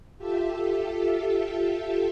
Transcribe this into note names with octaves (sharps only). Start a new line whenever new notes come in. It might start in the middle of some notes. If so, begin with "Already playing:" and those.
F4 G4 A4 E5